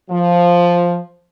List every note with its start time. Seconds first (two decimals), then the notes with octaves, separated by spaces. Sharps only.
0.10 F3